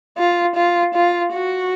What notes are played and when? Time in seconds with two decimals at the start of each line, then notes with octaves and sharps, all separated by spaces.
0.18 F4
0.56 F4
0.95 F4
1.33 F#4